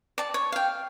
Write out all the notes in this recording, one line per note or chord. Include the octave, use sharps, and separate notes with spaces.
D5 A5
C#5
F5 G5